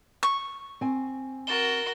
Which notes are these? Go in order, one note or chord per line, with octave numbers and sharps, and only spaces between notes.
C#6
C4 G#5
F#4 A#4 A6 E7 G7